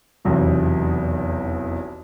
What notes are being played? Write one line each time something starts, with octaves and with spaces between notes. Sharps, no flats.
F1 B1 E2 C3